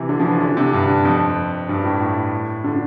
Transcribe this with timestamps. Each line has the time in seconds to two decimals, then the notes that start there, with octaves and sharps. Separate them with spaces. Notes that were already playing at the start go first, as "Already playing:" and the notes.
Already playing: C3 E3
0.09 D3
0.19 F3
0.25 E3
0.41 D3
0.57 C3
0.73 G2
1.05 F2
1.69 G2
1.84 A2
2.01 A2
2.64 D3